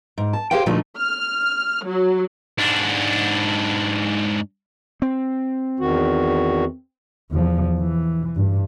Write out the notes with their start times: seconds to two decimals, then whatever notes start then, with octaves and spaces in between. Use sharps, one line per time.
0.18 G#2
0.33 A5
0.51 G4 G#4 C5 F5 G5
0.66 A#2 D3 F3 A3 D#4 F#4
0.96 F6
1.85 F#3
2.58 G#2 D4
5.02 C4
5.80 E2 D#3 F#4
7.31 E2 F3
7.79 E3
8.36 G2